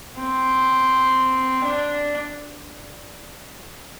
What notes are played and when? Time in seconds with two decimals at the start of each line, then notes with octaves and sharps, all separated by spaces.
0.19 C4
1.65 D4